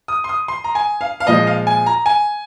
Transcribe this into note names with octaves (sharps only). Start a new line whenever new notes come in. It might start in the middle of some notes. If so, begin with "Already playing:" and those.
D#6
C6
D#6
C6
A#5
G#5
F5
F5
A#2 F3 G#3 D#5
F5
G#5
A#5
G#5